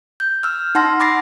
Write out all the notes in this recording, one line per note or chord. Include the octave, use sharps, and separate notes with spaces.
G6
E6 F6
D#4 F#5 A5 C6 A#6
B5 D6 A6 A#6 C7